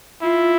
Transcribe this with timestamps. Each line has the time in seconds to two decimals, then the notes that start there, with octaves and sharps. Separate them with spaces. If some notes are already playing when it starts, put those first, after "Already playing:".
0.22 E4 F4